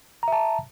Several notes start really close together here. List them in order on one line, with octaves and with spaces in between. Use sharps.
A#5 E5 A5